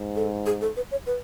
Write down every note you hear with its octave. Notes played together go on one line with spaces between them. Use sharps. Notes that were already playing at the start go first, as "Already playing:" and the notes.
Already playing: G#2
A4
G#4
A4
B4
C#5
B4